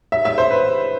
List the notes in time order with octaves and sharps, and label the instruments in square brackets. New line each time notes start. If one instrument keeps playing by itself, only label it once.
[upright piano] E5
E5
C5
B4